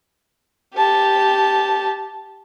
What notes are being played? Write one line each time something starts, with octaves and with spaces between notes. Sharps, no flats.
G4 A5